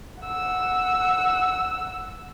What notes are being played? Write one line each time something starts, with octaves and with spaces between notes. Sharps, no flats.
F#5 E6